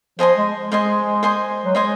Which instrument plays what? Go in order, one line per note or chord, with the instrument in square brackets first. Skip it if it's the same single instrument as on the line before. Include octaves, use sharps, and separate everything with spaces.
[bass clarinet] F3 [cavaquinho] C5 D#5 G#5 C6
[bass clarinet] G#3
[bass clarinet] G#3 [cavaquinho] C5 D#5 G#5 C6
[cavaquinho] C5 D#5 G#5 C6
[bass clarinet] F#3
[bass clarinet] G#3 [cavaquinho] C5 D#5 G#5 C6